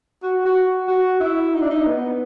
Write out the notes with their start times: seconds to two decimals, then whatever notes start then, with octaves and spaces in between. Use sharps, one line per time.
0.23 F#4
0.45 F#4
0.87 F#4
1.20 E4
1.54 D#4
1.62 D4
1.70 D#4
1.86 B3